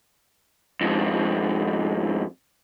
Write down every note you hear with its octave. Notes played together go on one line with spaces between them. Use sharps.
F2 G#2